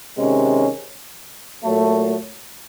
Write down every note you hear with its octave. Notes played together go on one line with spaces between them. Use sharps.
C3 D#3 G#3 C#4
A#2 F#3 A3